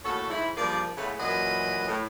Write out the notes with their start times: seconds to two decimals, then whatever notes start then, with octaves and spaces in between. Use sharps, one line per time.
0.05 D#2 A2 C#4 F#4 A4
0.30 G#2 E4
0.57 G2 F3 A#3 G#4 D5
0.97 A2 C#3 G#3 A3 B3
1.19 F#2 A#2 E3 F#3 B4 D#5
1.87 A2